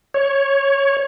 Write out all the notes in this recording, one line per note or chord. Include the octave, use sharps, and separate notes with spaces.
C#5